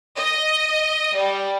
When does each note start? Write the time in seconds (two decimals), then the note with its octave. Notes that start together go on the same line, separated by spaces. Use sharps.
0.16 D#5
1.15 G3